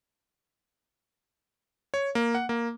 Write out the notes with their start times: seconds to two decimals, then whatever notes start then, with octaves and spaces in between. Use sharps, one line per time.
1.94 C#5
2.15 A#3
2.35 F#5
2.49 A#3